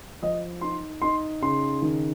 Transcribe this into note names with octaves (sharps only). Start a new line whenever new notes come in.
F3 D#5
D#4 C6
D#4 C6
C#3 C6
D#3